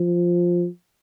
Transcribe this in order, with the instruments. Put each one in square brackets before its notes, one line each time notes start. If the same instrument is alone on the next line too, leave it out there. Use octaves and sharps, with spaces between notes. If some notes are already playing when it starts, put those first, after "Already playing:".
Already playing: [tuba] F3